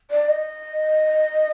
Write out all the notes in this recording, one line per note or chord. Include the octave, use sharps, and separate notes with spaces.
D5
D#5